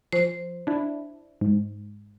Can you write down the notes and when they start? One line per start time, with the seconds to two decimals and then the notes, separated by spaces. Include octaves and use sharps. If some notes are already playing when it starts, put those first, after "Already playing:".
0.13 F3 C5
0.67 D4 E4
1.41 G#2